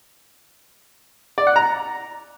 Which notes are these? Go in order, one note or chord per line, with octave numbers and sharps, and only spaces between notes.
D5
F#5
A#5